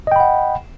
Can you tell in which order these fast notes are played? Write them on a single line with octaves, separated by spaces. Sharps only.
D#5 G5 B5 F#5